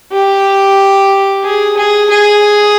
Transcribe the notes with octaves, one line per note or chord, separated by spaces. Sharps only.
G4
G#4
G#4
G#4